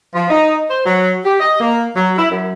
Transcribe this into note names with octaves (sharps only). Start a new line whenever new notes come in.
F3
D#4
C5
F#3
G4
D#5
A#3
F#3
E4
F#2